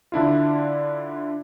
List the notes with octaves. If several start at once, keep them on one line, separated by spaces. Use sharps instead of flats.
D3 D4 E4 F4